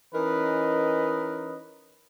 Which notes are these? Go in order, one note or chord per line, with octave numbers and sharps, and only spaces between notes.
E3 C#4 D#4 A#4 B4 D#5